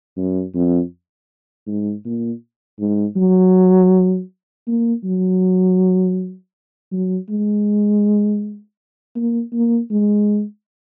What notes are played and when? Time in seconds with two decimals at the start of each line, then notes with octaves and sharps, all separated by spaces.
0.17 F#2
0.55 F2
1.67 G#2
2.05 A#2
2.79 G#2
3.16 F#3
4.67 A#3
5.04 F#3
6.92 F#3
7.29 G#3
9.16 A#3
9.53 A#3
9.91 G#3